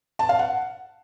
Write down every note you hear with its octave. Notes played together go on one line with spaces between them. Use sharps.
A5
F5
F#5